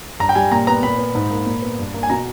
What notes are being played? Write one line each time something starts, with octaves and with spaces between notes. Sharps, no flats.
G2 A#5
G5
G3 G#5
A#2 A#5
B3 A#5
A#2 B5
B3
G#2
A#3
A#2
B3
G2
A#3
G#5
B2 A#5